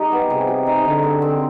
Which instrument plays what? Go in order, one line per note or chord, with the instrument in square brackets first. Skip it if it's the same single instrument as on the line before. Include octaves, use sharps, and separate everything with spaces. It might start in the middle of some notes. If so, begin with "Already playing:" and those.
Already playing: [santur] G3 D#4 G#4
B3
[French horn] C3 [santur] G#4
[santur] G3
D#4
[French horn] D3 [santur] D#4
[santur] C4
C4